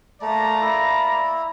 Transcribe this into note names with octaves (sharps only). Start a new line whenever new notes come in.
A3 A#3 D5 A#5
E4